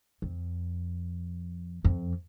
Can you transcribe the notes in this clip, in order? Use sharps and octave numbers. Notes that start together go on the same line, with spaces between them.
F2
F2